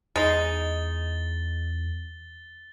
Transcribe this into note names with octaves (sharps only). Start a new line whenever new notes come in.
E2 G#3 D#4 A6 G7